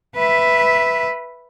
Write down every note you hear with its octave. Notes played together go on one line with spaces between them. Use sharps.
B4 E5